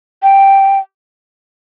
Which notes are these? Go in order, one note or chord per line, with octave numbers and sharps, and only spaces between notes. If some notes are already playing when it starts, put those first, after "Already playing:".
G5